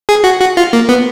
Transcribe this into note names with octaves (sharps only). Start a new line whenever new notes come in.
G#4
F#4
F#4
F4
A#3
B3